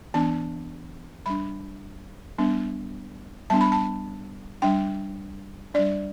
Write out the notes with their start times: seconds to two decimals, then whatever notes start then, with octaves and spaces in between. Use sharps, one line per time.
0.14 E3 B3 D4 A5
1.26 G3 D4 B5
2.38 G3 B3 D4
3.50 G3 B3 D4 A5
3.61 B5
3.72 A5
4.62 G3 D4 G5
5.74 G3 D4 D5